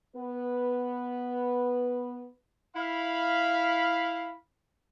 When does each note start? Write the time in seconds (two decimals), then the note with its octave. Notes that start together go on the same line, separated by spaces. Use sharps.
0.16 B3 B4
2.76 E4 F5 B5